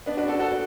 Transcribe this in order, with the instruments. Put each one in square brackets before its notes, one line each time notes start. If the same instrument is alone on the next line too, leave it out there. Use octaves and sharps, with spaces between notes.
[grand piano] B3 D4
D4 F#4
F#4 A4
F#4 A4